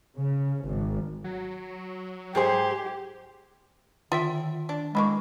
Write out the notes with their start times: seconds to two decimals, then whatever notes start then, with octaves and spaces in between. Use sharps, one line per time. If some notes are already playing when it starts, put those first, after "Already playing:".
0.18 C#3
0.65 G#1
1.24 F#3
2.35 G#2 G4 G#4 C5
4.12 D3 D#3 F4 E5 G5
4.69 D4
4.95 D3 E3 G#3 A#3 B5 C#6